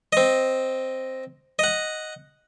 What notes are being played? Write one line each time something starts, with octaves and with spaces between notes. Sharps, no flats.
C4 D#5
D#5 F#5